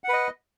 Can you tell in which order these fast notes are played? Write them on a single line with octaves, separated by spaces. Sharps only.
F#5 B4 D#5